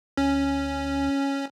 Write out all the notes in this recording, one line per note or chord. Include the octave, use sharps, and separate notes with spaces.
D2 C#4